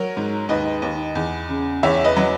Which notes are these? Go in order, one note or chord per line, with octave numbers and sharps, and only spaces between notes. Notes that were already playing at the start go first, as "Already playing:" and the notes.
Already playing: F#3 A#4 C#5
G#2
D#2 B4 D#5
D#2
E2
C#3
E2 C#5 E5
B4 D#5
F#3